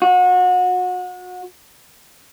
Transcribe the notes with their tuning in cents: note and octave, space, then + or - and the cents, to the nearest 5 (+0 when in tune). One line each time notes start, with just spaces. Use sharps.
F#4 -30